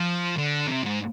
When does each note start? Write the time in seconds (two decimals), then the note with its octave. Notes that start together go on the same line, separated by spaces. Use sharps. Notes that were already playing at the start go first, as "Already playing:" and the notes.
Already playing: F3
0.37 D3
0.67 C3
0.83 G#2